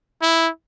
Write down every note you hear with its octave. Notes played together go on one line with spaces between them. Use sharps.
E4